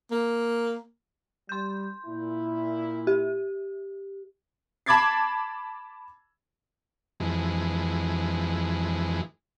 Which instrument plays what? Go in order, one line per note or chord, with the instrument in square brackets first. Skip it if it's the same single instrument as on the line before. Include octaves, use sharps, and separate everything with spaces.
[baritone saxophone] A#3
[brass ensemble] G3 [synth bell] C6 G6
[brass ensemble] A#2 E4
[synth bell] G4
[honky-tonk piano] A5 B5 D6 G#6 A6 C7
[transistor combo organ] F2 E3 G#3